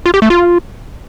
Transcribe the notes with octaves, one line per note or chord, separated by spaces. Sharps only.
F4
G4
A3
F4